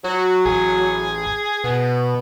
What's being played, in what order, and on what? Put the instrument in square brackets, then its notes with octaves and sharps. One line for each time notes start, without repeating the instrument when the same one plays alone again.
[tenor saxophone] F#3 [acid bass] F#4
[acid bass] A1 [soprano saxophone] G#4
[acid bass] B2 [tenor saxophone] B3